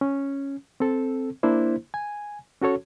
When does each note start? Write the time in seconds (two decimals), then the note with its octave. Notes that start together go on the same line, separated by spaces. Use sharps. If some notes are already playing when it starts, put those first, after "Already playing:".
0.01 C#4
0.80 C4 A4
1.43 A#3 D4 E4 C5
1.94 G#5
2.62 C#4 F#4 A4 C#5